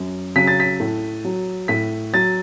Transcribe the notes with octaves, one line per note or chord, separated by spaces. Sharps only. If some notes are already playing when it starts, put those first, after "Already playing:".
Already playing: F#2
C#3 F#3 B6
A6
B6
A2
F#3
A2 B6
F#3 A6